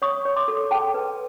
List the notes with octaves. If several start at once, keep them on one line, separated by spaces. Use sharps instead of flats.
C#5 C#6 D#6
C#5
C6 D6
A4
G#4 G5 A5
B4